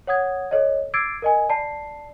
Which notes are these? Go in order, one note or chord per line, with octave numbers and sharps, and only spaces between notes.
C#5 F#5 D#6 G#6
A4 C#5 D#5
D6 E6 G#6 A6 C7 D7
A#4 D#5 G#5
D5 A5 B5 C7